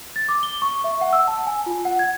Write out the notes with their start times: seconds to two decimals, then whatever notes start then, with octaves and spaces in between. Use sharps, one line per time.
0.16 A6
0.29 D6
0.43 G7
0.62 C#6
0.84 E5
1.01 F#5
1.13 E6
1.27 A5
1.47 G#5
1.66 F4
1.85 F#5
1.99 G#6